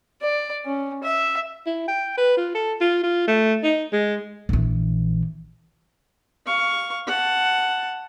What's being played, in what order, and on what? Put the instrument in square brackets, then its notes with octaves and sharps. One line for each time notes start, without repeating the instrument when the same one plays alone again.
[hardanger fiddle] D5
C#4
E5
[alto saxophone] E4
G5
B4
F4
A4
F4
F4
A3
D#4
G#3
[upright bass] A#1 E3
[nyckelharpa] F5 C#6
F#5 A5